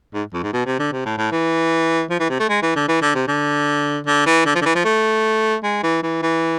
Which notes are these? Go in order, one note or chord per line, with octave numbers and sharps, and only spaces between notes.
G#2
F2
G#2
B2
C3
D3
C3
A2
A2
E3
F3
E3
C3
A3
G#3
E3
D3
E3
D3
C3
D3
D3
E3
D3
F3
D3
E3
F3
A3
G#3
E3
E3
E3